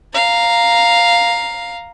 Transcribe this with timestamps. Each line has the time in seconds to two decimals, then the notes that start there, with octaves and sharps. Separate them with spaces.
0.14 F5 A#5